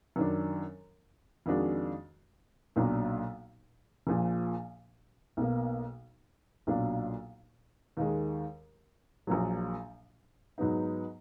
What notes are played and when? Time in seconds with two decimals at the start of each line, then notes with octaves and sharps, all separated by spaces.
0.16 F#2 D#3 F#3 D4
1.46 F2 D#3 G#3 D4 F#4
2.76 B1 A#2 F#3 D4
4.07 A#1 A#2 F3
5.37 B1 B2 A#3
6.67 B1 A#2 F#3 D4 F4
7.97 D#2 D#3 G#3
9.27 A#1 A#2 F#3
10.58 G#2 F#3 B3 D#4